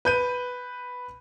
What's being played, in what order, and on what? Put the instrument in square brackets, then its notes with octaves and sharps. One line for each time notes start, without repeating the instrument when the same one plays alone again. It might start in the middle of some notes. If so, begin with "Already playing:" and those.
[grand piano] B4 G6 D#7